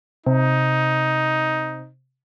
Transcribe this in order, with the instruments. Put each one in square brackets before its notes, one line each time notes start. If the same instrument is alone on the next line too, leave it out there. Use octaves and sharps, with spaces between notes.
[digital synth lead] C3 [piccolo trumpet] D#4